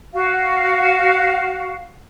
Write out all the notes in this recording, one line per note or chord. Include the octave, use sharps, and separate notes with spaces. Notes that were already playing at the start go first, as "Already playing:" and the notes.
F#4 F5